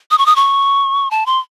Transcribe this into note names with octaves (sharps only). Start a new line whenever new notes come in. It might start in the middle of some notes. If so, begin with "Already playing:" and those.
D#6
C#6
D#6
C#6
A5
C6